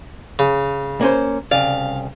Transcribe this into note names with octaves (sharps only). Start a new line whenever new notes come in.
C#3
A#3 C#4 C5
C2 C#3 D5 F5